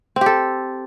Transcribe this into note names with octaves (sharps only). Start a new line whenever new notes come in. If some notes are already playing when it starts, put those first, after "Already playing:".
C4 G4 A4